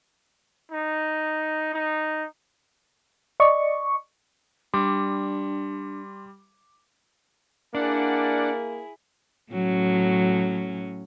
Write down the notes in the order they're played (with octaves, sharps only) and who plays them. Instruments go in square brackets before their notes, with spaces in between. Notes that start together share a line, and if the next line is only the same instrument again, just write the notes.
[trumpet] D#4
D#4
[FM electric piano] D5 D#5 C#6
[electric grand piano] G3 [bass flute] D4 [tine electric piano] C6 [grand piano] D6
[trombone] A#3 [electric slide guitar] D4 [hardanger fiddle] E4 G#4 [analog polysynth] D5 F#5
[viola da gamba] A2 F#3 C#4